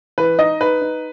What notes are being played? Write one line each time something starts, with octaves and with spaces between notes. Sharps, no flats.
E3 B4
D#4 D#5
D#4 B4
D#4